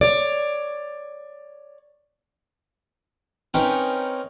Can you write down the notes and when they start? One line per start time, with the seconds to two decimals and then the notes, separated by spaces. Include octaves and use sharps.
0.01 C#5 D5
3.54 C4 C#4 D#4 A#4 B4